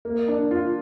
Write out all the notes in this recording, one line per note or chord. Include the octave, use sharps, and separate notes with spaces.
A#3
D4
F4